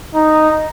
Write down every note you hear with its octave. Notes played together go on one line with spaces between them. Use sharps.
D#4